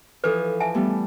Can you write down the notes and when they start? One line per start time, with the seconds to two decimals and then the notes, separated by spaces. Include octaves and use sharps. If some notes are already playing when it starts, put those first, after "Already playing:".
0.24 E3 F3 A4 B4
0.60 E5 G#5 A5
0.75 G3 A3 B3